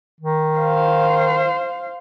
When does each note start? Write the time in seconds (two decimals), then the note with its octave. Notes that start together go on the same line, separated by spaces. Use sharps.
0.21 D#3
0.59 C5 F5